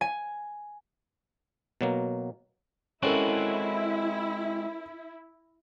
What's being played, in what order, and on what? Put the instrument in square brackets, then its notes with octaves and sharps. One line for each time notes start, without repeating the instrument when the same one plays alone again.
[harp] G#5
[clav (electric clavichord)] B2 F#3 A#3
[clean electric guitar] G#3 C4 F#4 [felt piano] C#4 A4 A#4 [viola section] E4